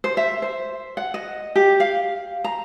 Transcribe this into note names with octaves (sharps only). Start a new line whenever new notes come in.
C5
E5
C5
F#5
D#5
G4
F5
A#5